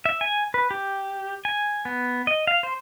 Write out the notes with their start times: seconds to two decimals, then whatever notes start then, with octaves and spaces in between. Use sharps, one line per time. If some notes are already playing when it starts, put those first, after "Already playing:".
0.06 E5
0.21 G#5
0.54 B4
0.71 G4
1.45 G#5
1.85 B3
2.27 D#5
2.47 F5
2.63 C5